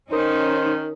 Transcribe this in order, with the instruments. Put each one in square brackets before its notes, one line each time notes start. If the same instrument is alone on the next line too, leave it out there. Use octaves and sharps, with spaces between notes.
[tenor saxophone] D#3 [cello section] C#4 D#4 [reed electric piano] A#4 D#6 [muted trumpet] C5